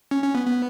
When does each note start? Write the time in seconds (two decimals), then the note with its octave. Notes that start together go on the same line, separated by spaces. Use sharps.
0.11 C#4
0.23 C#4
0.35 B3
0.46 B3